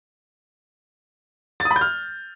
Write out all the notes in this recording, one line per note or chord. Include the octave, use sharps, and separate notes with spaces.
A6
D#6
B5
G6
F6